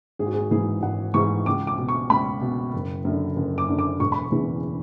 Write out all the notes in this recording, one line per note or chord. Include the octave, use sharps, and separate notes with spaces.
G#1 G#4
F#4
G#4
G#2 E3 G#4
G#1 F#5
G#2 E3 C#6
C#2 D6
D6
B2
C#6
C#2 B5
B2
F#1
F#2 D3
F#1
D6
F#2 D3
D6
E1 C#6
B5
C#6
E2 C#3 E3